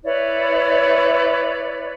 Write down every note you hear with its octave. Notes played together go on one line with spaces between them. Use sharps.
E4 B4 C#5 D5